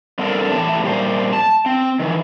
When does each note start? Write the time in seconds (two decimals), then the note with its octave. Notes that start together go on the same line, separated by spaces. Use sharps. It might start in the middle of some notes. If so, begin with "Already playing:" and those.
0.19 G3 B3 C4 D4 A4 A#4
0.52 A2 E3 G4 A5
0.82 A#2 G3 C5
1.33 A5
1.66 C4
1.99 D#3 E3